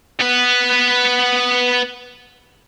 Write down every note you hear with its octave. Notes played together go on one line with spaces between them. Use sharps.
B3 B4